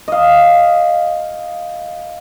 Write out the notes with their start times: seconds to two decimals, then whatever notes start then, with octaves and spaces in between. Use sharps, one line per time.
0.08 D#5 F5